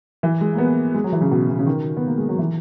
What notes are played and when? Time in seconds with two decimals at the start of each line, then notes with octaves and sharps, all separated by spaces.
0.23 E3
0.41 G#3
0.54 A#3
0.58 B3
0.94 G#3
1.04 F#3
1.12 E3
1.21 C#3
1.31 B2
1.50 B2
1.59 C#3
1.67 D#3
1.97 B3
2.07 A#3
2.18 G#3
2.29 F#3
2.39 E3